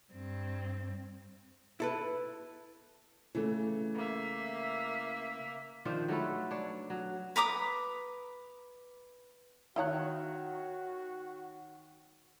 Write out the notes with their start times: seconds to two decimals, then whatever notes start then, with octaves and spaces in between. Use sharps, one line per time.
0.12 G2 C4
1.80 E4 A4 B4
3.35 C#3 E3 A3
3.96 A#3 E5
5.85 D#3 F3 D4 C5
6.08 F#3 A3 A4 B4
6.51 D4 C#5
6.90 F#3
7.36 B4 A#5 D6 D#6
9.76 D#3 E4 F#4 C#5 F5 A#5 F#6